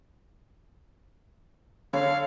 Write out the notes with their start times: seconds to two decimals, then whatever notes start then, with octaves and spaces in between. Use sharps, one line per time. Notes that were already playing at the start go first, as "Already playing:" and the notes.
1.93 D3 C#5 F5